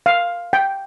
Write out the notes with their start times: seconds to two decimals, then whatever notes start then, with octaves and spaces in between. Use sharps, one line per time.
0.06 F5
0.53 G5